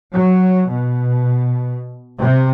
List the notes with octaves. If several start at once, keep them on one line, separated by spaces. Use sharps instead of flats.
F#3
B2
C3